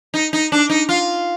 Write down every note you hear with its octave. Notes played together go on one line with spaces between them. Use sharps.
D#4
D#4
D4
D#4
F4